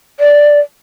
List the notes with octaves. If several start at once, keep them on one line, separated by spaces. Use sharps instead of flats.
D5